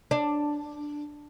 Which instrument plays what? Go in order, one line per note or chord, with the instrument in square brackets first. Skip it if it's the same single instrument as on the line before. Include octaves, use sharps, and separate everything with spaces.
[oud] D4